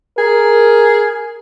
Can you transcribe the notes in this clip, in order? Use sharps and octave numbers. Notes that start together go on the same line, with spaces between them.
G#4 A#4